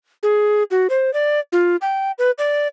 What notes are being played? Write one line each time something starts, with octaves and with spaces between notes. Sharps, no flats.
G#4
F#4
C5
D5
F4
G5
B4
D5